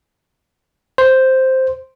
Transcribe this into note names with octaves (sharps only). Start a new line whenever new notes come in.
C5